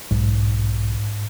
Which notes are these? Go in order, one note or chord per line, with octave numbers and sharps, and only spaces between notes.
B1 G#2